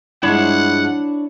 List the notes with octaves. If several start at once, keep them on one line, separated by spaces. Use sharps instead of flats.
G2 F3 G#3 D4 E4 C#5 F#5 B5